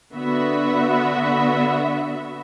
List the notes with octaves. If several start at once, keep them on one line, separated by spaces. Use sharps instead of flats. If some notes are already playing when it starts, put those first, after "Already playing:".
D3 B3 F#4 E5